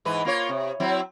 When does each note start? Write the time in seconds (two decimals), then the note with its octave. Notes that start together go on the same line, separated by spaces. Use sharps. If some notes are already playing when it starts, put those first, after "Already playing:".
0.05 G#2 E3 B4
0.25 A#3 F4 C#5
0.49 C3
0.80 F#3 C4 E4